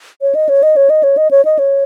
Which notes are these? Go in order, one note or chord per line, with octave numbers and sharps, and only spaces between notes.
C#5
D#5
C#5
D#5
C#5
D#5
C#5
D#5
C#5
D#5
C#5